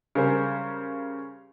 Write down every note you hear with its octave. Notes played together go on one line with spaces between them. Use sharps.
C#3 G3 A#4 C5 G#5